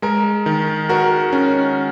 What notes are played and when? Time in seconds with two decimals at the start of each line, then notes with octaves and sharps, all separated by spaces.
0.02 G#3 A#4
0.46 D#3
0.89 F#4 A#4
1.32 C#4